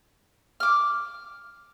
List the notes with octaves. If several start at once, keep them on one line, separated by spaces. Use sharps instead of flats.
D6 F6